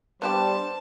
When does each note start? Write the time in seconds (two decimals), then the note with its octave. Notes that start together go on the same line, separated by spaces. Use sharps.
0.22 G3 B3 D4 F#4 G4 C5 A5